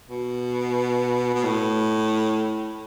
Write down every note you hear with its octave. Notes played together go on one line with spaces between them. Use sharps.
B2
B2
A2